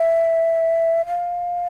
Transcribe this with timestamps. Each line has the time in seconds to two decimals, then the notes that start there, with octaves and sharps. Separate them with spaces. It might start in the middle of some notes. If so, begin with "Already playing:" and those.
Already playing: E5
1.07 F5